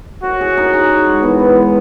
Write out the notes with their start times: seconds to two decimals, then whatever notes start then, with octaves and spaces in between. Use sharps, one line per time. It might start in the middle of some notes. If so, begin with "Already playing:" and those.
0.23 F#4 C#5
0.41 G#4
0.57 D#4
0.73 G#4
0.90 G#4
1.06 G#3
1.23 E3 B3
1.39 E3
1.57 G#3